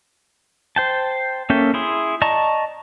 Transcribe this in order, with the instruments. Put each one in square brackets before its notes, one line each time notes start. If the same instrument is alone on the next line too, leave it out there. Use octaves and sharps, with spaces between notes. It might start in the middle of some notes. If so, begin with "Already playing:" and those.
[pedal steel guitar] C5 G5 A5
A#3 C#4 A4 E5 G5
E4 G#4 C6
D5 D#5 A5 A#5 C#6